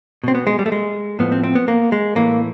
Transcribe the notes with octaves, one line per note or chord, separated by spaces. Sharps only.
B2 C4
B3
G#3
G3
A3
G#3
A2 F3 B3
C4
C4
B3
A#3
G#3
A2 E3 A#3